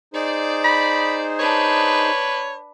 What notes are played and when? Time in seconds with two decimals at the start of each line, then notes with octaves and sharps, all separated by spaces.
0.14 D#4 G#4 C5 D5
0.64 B5
1.39 D4 B4 C#5